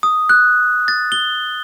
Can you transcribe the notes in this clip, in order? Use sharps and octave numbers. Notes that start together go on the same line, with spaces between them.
D#6
F#6
A6
G7